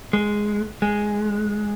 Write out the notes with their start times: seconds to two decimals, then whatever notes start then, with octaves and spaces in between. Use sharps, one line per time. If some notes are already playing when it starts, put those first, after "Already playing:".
0.13 G#3
0.82 G#3